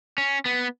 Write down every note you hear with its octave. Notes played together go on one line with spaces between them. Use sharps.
C#4
B3